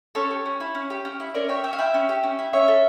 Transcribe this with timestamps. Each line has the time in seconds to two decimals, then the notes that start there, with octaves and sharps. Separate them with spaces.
0.15 C#4 A4 C#5
0.31 G4
0.46 C#4
0.60 E4
0.75 C#4
0.90 G4
1.05 C#4
1.20 E4
1.34 C#4 A#4 D5
1.49 G4 C#5 E5
1.64 C#4 E5 G5
1.73 F5
1.78 E4 E5 G5
1.94 C#4
2.09 G4
2.23 C#4
2.39 E4
2.53 C#4 C#5 E5
2.68 A4